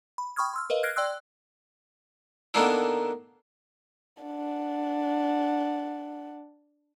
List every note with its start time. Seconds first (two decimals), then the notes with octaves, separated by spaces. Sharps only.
0.18 B5
0.36 G5 B5 C#6 D#6 F6 G#6
0.54 C6 E6 F6
0.70 A#4 B4 D#5 F5
0.83 F6 F#6 G#6 A#6 C7 D7
0.96 D5 G5 C6 E6 F#6
2.54 D3 D#3 A#3 B3 D4 E4
4.23 D4 F#5